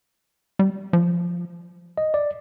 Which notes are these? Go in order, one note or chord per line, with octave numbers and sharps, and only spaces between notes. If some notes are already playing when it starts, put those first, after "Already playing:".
G3
F3
D#5
D5